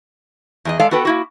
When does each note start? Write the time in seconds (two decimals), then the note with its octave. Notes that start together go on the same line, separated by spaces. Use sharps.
0.65 E2 G#4 D#5
0.79 G#3 A4 D5 F5
0.91 B3 F#4 A4 B4 G5
1.05 A#3 E4 F#4